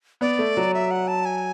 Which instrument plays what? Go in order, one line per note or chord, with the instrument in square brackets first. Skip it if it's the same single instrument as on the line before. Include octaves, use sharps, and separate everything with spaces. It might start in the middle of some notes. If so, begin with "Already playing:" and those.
[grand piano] B3 [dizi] D5
[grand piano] A3
F#3
[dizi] E5
F#5
A5
G#5